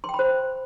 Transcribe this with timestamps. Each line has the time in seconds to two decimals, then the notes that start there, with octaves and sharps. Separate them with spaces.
0.04 C6
0.09 G5
0.14 B5
0.19 C5